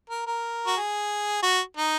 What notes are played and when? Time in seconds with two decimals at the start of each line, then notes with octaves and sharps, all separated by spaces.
0.10 A#4
0.27 A#4
0.67 F#4
0.77 G#4
1.43 F#4
1.77 D#4